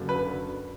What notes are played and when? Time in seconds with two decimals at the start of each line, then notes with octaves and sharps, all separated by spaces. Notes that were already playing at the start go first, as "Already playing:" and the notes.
Already playing: F#1 F#2 D3
0.09 B4